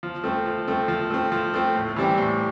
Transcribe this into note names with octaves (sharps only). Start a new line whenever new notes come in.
F3
A3 C4
F3
A3 C4
F3
A3 C4
F3
A3 C4
A2
E3 G3 C4 G4
A2